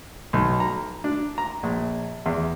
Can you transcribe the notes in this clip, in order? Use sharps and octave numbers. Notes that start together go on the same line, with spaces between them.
B1
A#5
D4
A#5
A#1
E2